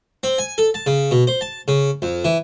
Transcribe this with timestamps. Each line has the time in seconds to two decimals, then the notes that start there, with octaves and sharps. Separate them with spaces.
0.23 C4
0.38 G#5
0.58 A4
0.74 A5
0.86 C#3
1.11 B2
1.27 C5
1.41 A5
1.68 C#3
2.02 F2
2.25 E3